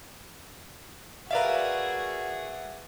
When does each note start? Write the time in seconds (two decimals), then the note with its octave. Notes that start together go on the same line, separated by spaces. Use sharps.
1.31 F#4 G#4 A#4 B4 D5 E5 F5